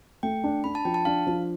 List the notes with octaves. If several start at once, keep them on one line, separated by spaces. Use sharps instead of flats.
A3 G5
D4
D4 B5
A5
F3 G5
A5
D4 F5
F3